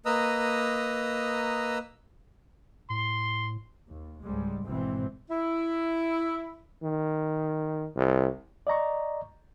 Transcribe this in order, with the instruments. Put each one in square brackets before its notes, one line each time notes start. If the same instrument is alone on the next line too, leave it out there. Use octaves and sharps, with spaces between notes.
[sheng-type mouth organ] A#3 B4 D#5 A#5 D#6 E6
[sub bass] A2 [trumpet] C6
[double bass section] D#2
C#2 G#2 G3 G#3
G#1 G#2 B2 E3 C4
[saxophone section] E4
[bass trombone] D#3
C2
[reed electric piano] D5 D#5 A#5 C#6